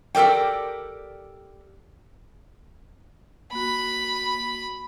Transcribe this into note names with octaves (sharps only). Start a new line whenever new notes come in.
G4 A4 A#4 D5 G5
A#3 F#4 B5